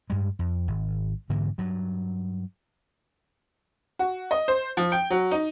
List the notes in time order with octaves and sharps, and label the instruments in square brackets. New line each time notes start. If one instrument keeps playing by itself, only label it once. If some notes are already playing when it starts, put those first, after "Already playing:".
[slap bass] G2 G3 G#3
F2
G#1
G#2 D3 E3 A#3
G2 F#3
[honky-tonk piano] F#4
D#5
C5
F3
G5
F#3
D#4